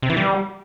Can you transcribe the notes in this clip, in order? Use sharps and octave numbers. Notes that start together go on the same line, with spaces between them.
C3
E3
G3